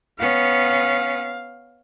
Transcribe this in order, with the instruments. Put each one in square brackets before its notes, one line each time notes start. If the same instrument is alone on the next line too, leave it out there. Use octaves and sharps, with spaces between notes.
[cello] B3 C#4 [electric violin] F5